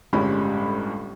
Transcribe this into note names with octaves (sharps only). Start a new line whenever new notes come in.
G1 A2 G3 G#3 C#4 B5